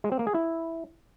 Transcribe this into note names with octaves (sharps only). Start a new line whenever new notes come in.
G#3
C4
A#3
G#4
E4